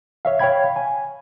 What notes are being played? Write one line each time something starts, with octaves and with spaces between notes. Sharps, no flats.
C#5 E5 F5
C#5 F5 G5 B5 G#6
G#5